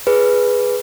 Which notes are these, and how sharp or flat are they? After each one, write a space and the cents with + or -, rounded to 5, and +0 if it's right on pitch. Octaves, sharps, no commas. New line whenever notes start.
G#4 +0 B4 +0